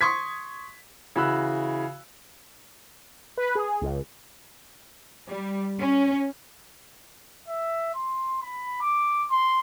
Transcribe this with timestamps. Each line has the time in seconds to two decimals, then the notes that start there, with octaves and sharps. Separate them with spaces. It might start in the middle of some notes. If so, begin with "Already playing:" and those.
0.01 C6 C#6 D#6 G#6 B6
1.16 C#3 E3 F#4 B5 E6 F#6
3.37 B4
3.55 G#4
3.82 C#2
5.28 G3
5.79 C#4
7.48 E5
7.95 C6
8.42 B5
8.81 D6
9.31 C6